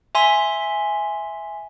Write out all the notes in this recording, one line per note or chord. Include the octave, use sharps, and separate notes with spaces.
E5 G#5 C6 B6